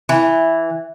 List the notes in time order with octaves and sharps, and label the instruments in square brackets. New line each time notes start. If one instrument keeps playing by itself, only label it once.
[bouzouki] E3